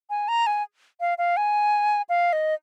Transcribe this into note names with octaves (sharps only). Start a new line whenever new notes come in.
G#5
A#5
G#5
F5
F5
G#5
F5
D#5